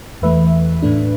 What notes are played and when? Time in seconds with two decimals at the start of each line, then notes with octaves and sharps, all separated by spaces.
0.22 E2 E3 A3 B4 E5
0.82 A2 A3 D4